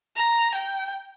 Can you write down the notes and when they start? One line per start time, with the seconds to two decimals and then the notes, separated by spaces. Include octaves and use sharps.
0.15 A#5
0.55 G5